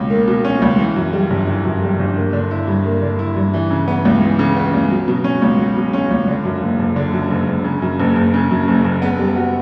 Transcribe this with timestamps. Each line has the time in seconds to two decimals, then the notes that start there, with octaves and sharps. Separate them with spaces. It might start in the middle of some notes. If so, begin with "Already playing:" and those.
Already playing: C#2 B2 C#4
0.10 A#3
0.28 B2
0.45 C#4
0.62 C#2
0.79 E3
0.96 F#2
1.13 G3
1.30 G1
1.47 E3
1.65 F#2
1.82 G3
1.99 G1
2.16 A#3
2.33 D3
2.51 E4
2.67 G2
2.85 A#3
3.02 D3
3.19 E4
3.36 G2
3.54 E3
3.71 C#3
3.88 B3
4.05 C#2
4.22 E3
4.39 C#3
4.57 B3
4.74 C#2
4.90 F#3
5.08 B2
5.24 C#4
5.42 C#2
5.59 F#3
5.76 B2
5.93 C#4
6.11 C#2
6.28 D3
6.45 F#2
6.62 F#1
6.79 F#1
6.96 D3
7.13 F#2
7.31 F#1
7.48 F#1
7.64 C#3
7.82 F#2
8.00 F#1
8.16 F#1
8.34 C#3
8.51 F#2
8.68 F#1
8.84 F#1
9.02 B3
9.19 G3
9.36 F#4